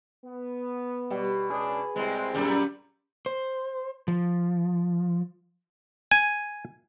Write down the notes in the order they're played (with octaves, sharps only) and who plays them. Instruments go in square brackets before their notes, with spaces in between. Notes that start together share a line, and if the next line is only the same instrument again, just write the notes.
[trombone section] B3
[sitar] B2 [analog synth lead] G3
[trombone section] C#2 C#4 D4 [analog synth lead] G#4
[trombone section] C2 C4 [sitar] G#3
[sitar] F#2 A#2 G3
[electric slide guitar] C5
F3
[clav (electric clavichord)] G#5